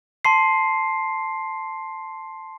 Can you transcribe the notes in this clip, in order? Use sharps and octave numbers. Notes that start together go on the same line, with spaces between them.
A5 C6 C7